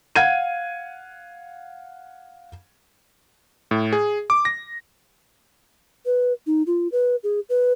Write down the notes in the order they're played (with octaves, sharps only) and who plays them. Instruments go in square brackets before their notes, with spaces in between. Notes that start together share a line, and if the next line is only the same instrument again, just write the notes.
[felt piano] F5 F#5 G#6 D#7
[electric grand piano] A2
G#4
D6
A#6
[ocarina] B4
D#4
F4
B4
G#4
B4